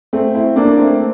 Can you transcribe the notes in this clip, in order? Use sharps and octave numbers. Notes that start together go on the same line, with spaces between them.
A3 C4
C4 E4
A#3 D4
A3 C4